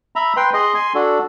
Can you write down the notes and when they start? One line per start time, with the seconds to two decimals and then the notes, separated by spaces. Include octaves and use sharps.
0.16 E5 A#5 B5
0.37 B4 G5 C6
0.54 G#4 D#5 C6
0.74 G#5 C6
0.95 D4 F#4 A4